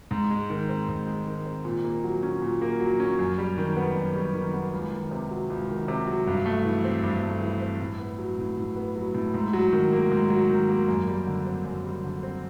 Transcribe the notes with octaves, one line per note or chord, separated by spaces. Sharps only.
G#2
G#3
D#3
C4
G#2
G#3
D#3
C4
A#2
A#3
F#3
C#4
A#2
A#3
F#3
C#4
F#2
G3
D#3
B3
F#2
G3
D#3
B3
C#2
D#3
C3
F#3
C#2
D#3
C3
F#3
G2
A3
E3
C4
G2
A3
E3
C4
A2
B3
F#3
A2
A2
B3
F#3
A2
G#2
F#3
D#3
A#3
G#2
F#3
D#3
A#3
F#2
G3
D3
C4
F#2
G3
D3
C4